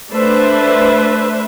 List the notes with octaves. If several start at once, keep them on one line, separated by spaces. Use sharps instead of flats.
A3 D4 B4 C5 E5